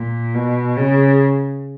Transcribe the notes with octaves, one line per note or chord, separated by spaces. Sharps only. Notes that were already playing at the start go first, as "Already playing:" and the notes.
Already playing: A#2
B2
C#3